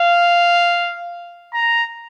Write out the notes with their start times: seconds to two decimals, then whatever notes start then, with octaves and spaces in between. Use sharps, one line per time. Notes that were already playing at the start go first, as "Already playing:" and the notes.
Already playing: F5
1.54 A#5